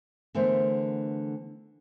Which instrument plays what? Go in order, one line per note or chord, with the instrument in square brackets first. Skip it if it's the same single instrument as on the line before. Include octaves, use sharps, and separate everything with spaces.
[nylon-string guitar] D3 E3 A3 B3 A#4 C5